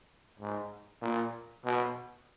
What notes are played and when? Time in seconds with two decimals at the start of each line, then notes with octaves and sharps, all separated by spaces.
0.39 G#2
1.02 A#2
1.65 B2